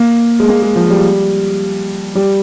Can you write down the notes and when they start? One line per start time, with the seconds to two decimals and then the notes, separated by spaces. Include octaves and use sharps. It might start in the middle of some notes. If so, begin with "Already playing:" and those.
Already playing: A#3
0.40 G#3
0.48 A#3
0.62 G#3
0.76 F3
0.90 G3
2.15 G3